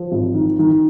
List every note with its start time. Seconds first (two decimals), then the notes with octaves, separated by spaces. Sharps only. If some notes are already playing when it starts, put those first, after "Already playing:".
Already playing: F3
0.12 G#1
0.35 D#3
0.59 D#3